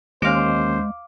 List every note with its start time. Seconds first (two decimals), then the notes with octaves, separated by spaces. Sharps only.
0.22 D#2 G#3 C#4 C5 F5 D6